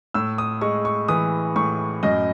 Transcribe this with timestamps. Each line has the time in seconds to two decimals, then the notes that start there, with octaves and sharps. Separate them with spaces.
0.14 A2 E6
0.38 D#6
0.61 G#3 C#6
0.85 C#6
1.08 E3 D#6
1.56 A2 C#6
2.03 F#2 D#5